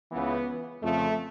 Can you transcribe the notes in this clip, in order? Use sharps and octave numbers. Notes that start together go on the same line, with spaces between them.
C#2 C#3 E3 B3
F2 C#3 F3 A3